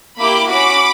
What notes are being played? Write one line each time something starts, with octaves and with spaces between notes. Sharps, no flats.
A#3 E4 G4 B5 D6
C#4 F#4 B5 D6